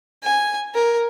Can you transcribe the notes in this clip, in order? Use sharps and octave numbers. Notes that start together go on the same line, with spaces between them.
G#5
A#4